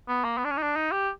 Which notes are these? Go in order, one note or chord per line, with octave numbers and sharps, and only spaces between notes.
B3
A#3
B3
D4
C#4
D#4
D4
D#4
G4